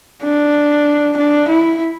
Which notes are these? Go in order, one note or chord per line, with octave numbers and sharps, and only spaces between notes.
D4
D4
E4